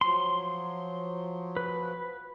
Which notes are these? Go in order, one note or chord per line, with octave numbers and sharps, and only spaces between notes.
F3 F#3 C6
B4